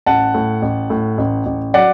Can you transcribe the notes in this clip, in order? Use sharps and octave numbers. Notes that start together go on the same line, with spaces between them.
A1 F#5 A5
A2
A1
A2
A1
A1
F#3 D5 F#5